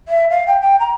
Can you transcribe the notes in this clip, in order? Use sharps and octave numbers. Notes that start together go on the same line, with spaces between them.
E5
F5
G5
G5
A#5